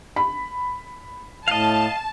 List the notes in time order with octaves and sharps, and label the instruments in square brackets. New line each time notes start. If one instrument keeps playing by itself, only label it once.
[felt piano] B5
[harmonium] A2 [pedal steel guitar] D#5 F5 [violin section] A5